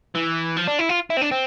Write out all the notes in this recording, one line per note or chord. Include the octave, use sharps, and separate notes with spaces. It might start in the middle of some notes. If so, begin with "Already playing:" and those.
E3
F3
D4
E4
F4
E4
C4
D4
C4